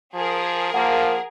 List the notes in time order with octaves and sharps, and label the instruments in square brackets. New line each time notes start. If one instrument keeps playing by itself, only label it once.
[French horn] F3 [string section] G#4 A#4
[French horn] F3 [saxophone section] A#3 [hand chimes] F#5